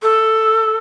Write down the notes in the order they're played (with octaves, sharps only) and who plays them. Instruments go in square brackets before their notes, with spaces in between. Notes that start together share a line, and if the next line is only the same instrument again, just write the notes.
[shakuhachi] A4